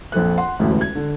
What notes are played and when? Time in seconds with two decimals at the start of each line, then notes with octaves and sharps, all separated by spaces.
0.12 A#1 F2 A4 F#6
0.38 F#5 C6
0.59 E1 A1 D2
0.81 G#6
0.95 D3